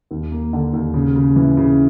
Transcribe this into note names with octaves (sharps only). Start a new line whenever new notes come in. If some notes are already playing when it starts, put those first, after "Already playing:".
D#2
A#3
D3
D#2
C#3
C#3
E3
C#3